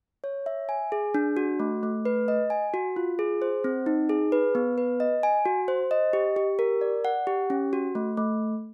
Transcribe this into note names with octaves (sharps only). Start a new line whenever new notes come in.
C#5
E5
G#5
G#4
D4
F#4
A3
A3
B4
D#5
G#5
F#4
F4
G#4
C5
C4
D#4
G#4
B4
B3
B4
D#5
G#5
F#4
C5
D#5
G4
G4
A#4
D5
F#5
G4
C#4
F#4
A3
A3